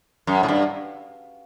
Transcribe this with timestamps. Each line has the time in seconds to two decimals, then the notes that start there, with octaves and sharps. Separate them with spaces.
0.27 F#2
0.43 A2
0.48 G2